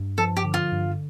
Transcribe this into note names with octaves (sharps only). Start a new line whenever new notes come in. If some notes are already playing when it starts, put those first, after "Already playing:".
Already playing: G2
F3 A4
G4
D3
F4
G2